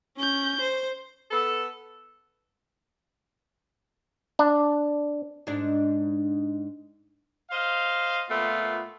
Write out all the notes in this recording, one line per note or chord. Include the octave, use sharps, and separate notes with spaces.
C#4 G6
C5
B3 A4
D4
G#2 D4
C5 D#5 F5
A#2 A3 B3 F4